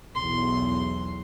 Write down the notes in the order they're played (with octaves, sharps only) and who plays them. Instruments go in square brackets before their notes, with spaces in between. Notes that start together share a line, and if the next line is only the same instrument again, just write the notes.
[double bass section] B1 E2 [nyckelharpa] C6